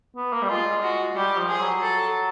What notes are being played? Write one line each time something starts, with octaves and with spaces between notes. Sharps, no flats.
B3
A#3
G3
G#3 F4
F#4
G3 G4
F3
G#4
F#3
A4